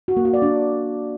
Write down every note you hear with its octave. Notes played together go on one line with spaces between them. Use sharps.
F#4
A#3
F#4
D5
D4